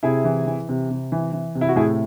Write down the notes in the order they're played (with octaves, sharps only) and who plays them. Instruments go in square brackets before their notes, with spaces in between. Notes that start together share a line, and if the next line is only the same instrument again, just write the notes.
[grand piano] C3 E4 G#4
E3
E3
C3
C3
E3
E3
C3
E4
F#4
A2 E4 G#4